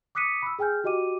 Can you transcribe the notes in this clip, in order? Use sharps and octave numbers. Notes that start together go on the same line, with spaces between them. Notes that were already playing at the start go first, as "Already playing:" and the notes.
D6 D#6 F#6 B6 C#7 D#7
B5 E6
G#4 G5 G#5 F6 G6
F#4 G4 D#5 G5 D6 D#7